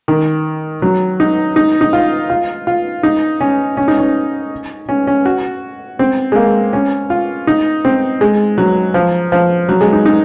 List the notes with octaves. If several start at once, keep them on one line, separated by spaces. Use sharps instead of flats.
D#3
F#3
D#4
D#4
D#4
F4
F4
F4
D#4
C#4
C#4
D#4
C#4
C#4
C#4
F#4
C4
G#3
A#3
C#4
F4
D#4
C4
G#3
F#3
F3
F3
F#3
G#3
D#4
D#4